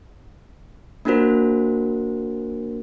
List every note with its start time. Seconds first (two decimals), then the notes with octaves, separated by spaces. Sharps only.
1.05 A#3 D4 F4 F#4 A#4 C5